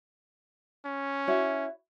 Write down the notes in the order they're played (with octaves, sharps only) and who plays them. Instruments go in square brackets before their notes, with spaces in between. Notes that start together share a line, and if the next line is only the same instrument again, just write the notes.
[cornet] C#4
[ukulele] E4 F#4 C#5